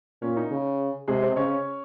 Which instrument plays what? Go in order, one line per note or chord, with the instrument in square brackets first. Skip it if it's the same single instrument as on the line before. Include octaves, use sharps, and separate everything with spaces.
[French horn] A#2 [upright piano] C#4
[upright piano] D#4
[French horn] C#3
[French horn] C3 [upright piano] G#3 G#4
[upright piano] C4 C5
D#5
[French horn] C#3 [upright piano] C#4 C#5